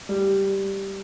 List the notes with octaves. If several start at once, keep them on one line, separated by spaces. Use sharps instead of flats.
G3